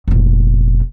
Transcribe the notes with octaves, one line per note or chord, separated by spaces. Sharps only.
F1 A#1